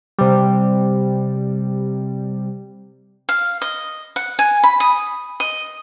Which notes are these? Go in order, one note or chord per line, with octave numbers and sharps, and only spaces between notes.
C3 G3
F5
D#5
F#5
G#5
B5
D#6
D#5